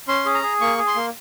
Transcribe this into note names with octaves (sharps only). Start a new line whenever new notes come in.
C#4 C6
G#4
A#5
G#4
A#3 C#6
G#4
C6
A#3